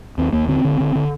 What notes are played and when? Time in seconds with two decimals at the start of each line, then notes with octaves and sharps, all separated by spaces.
0.18 D#2 C4
0.33 D#2 A#3
0.48 D3 C4
0.65 D3
0.80 D3
0.95 D3